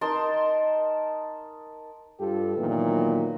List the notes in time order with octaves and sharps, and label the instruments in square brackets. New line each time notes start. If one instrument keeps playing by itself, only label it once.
[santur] D#4 A#4 A5 C6
[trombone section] G2 F4 G4 A4
A#2 D#3 E3 F#3 B3